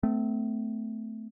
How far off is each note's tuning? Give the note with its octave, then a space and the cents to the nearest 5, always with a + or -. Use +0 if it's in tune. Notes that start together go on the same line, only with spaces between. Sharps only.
A3 +0 C4 -40